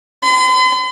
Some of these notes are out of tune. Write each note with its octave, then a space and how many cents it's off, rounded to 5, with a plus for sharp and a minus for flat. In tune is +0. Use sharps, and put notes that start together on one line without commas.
C6 -45